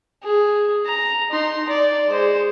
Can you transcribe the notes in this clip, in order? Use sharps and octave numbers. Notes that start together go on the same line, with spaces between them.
G#4
A#5
D#4 C6
D5
G#3 C5